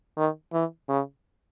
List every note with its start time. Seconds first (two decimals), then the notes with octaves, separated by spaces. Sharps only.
0.17 D#3
0.53 E3
0.89 C#3